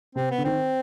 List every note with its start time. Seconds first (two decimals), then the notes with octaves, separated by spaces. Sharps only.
0.15 C3 C4
0.30 B3
0.38 D3
0.45 D#3 C4